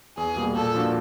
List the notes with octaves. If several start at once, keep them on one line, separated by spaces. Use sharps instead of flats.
E2 G#4
B2 G3 A#3
A#2 A4
F3 A#3 D4 F#4